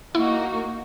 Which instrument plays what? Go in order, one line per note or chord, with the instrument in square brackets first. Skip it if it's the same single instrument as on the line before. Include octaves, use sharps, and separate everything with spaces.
[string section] A#3 D#4 F#4 [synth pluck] E4